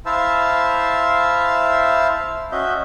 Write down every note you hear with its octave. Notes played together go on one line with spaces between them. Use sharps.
E4 C5 E5 F5 A5 E6
C#4 F#4 D#5 E5 G6